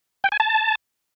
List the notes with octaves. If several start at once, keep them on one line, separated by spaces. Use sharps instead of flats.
G5
G#5
A5